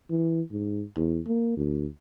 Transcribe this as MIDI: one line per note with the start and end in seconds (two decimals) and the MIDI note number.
0.10 0.41 52
0.51 0.83 44
0.96 1.19 40
1.27 1.56 58
1.57 1.86 38